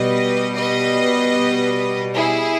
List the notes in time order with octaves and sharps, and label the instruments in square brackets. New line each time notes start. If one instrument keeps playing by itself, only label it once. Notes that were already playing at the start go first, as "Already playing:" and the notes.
Already playing: [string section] B2 G3 B4 D#5
B4 D#5
E4 G#4